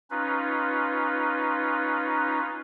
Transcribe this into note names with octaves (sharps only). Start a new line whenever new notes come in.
C#4 D#4 F4 B4